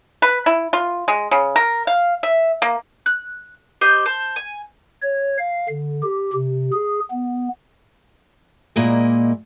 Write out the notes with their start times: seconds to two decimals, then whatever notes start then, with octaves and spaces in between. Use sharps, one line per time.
0.22 B4
0.46 E4
0.73 F4
1.08 G#3
1.31 C#3
1.56 A#4
1.87 F5
2.23 E5
2.62 A#3
3.06 F#6
3.81 G4 C5 D#5
4.06 C5 A5
4.36 G#5
5.02 C#5
5.38 F5
5.69 D3
6.03 G4
6.33 C3
6.72 G#4
7.11 B3
8.76 A#2 G#3 A#3 E4 D#5